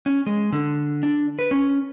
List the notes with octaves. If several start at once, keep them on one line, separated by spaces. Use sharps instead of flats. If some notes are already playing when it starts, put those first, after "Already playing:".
C#4
G#3
D3
D4
B4
C#4